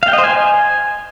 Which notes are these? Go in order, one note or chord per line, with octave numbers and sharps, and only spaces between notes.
F5
G5
D#5
C5
G#5